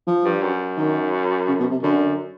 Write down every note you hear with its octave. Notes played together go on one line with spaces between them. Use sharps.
F3
G2
F#2
D#3
C#3
B2
C3
F#2 D3